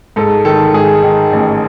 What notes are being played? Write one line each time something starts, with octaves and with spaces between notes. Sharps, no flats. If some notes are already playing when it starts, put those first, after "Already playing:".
G#2 A4
D#3 A4
G#2 G#4
D#3
A1